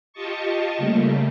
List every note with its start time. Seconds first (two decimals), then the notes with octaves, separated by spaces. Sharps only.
0.13 F4 G4 D#5 A5 C#6
0.78 C#3 G3 A3 A#3